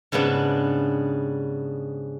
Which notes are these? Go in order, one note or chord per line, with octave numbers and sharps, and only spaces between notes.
G#2 C#3 G3 B3 D4